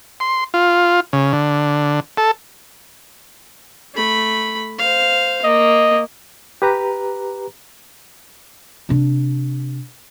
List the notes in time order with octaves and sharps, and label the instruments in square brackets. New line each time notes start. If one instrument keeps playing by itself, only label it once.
[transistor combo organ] C6
F4
C#3
D3
A4
[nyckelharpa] A3 B5
C5 F5
[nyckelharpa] A#3 [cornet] D#5
[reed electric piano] G4 B4 A#5
[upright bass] C3 D4